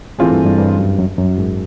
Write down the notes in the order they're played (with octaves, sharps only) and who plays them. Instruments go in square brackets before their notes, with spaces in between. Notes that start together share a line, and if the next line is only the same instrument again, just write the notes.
[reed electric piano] G#2 [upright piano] E3 A3 C4 F4 G#4
[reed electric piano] G2
G2
G2
F#2
F#2
F#2
G#2